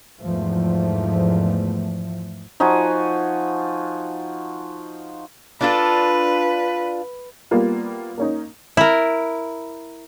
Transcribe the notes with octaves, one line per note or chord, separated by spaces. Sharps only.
E2 G#2 F3 A3
F3 D#4 F#4 G#5
D4 F4 A4 B4
G3 A#3 B3 F4
A#3 C#4 D#4
E4 A#4